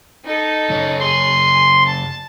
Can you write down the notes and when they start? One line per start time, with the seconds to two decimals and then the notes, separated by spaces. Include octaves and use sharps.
0.25 D#4 A4
0.70 F#2 C#3 C#5
1.00 G#4 G#5 C6
1.86 A5